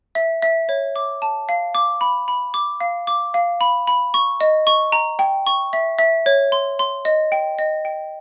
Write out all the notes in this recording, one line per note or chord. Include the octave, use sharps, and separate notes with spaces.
E5
E5
C#5
D6
A5
F5
D6
B5
B5
D6
F5
D6
F5
B5
B5
C#6
D#5
C#6
A#5
G5
C#6
E5
E5
C#5
C6
C6
D#5
G5
D#5
G5